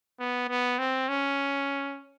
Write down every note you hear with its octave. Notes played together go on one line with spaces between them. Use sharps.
B3
B3
C4
C#4